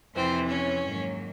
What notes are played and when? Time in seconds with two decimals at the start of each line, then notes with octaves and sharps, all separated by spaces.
0.14 F2 C3 E3 C4 C5
0.49 C#4 C#5
0.83 G#2 D#3 F#3 A#3